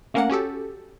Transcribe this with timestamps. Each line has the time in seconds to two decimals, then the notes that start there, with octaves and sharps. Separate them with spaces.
0.14 A3 A#3 C#4 A#4 F5 F#5
0.29 C#4 F#4 G4 A4